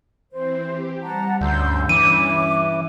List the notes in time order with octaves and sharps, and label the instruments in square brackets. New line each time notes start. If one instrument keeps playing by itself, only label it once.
[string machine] E3 C4 [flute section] C5
[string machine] G4
[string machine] G3 [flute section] F#5 A5 A#5
[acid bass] D2 [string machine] G2 C#4 [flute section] C6 E6 G6
[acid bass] E3 [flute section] D6 [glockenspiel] D#7